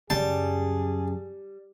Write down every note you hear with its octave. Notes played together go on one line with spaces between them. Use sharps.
F#2 C#3 G3 G#4 A5